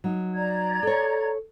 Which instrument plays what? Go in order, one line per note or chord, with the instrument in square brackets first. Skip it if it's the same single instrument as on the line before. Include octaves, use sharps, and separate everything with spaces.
[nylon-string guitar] F#3 D#4
[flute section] D5 A#5 G#6
[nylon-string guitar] A4 C#5